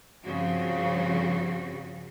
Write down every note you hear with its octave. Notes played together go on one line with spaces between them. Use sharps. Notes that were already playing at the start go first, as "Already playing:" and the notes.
G2 C#3 F3 C4 F#4